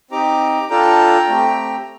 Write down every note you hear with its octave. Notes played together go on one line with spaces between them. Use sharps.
C4 D#4 G4 A#5 D6
D4 F4 A4 G5 A#5
A3 C4 G4